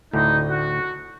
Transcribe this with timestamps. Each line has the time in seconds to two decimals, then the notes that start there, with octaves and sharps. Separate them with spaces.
0.13 D2 A2 D3 D#4
0.50 F#4